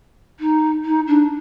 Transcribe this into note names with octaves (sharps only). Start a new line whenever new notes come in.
D#4
D#4
D4